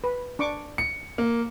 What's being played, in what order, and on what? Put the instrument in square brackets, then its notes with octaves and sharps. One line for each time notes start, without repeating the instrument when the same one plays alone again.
[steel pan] B4
D4 C#6 D6
[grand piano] C#7
A#3